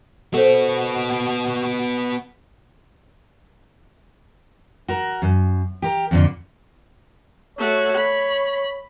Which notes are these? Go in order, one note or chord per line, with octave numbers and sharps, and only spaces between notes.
B3 F#4 A4 C5
F#4 A#4
F#2
G4 A#4
F2 A#2 D3
A3 F#4 C#5
B5